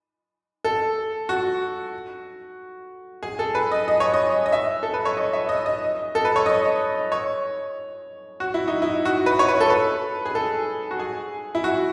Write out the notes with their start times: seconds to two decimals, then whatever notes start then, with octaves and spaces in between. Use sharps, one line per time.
0.65 A4
1.29 F#4
3.23 G#4
3.39 A4
3.55 B4
3.71 D#5
3.88 D#5
4.00 C#5
4.14 D#5
4.46 D#5
4.52 E5
4.83 A4
4.94 B4
5.05 C#5
5.17 D#5
5.33 E5
5.49 D#5
5.66 D#5
6.15 A4
6.25 B4
6.36 C#5
6.46 D#5
7.12 C#5
8.40 F#4
8.54 E4
8.68 D#4
8.82 E4
9.05 F#4
9.26 B4
9.39 C#5
9.48 B4
9.60 A4
9.70 B4
10.25 G#4
10.35 A4
10.91 F#4
10.99 G#4
11.55 E4
11.64 F#4